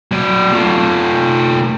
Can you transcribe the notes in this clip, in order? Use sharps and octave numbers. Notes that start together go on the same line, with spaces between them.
F#3 D5
A3 F4